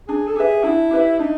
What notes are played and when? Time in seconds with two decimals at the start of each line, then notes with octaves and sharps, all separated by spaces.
0.08 D4 G#4
0.27 A4
0.36 G4 G#4 B4 E5
0.63 D4 E4
0.91 G4 B4 E5
1.19 D4 D#4